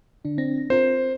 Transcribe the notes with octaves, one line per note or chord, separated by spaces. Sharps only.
D3 D4
C4 D4 A#6
C4 F4 A#4 C5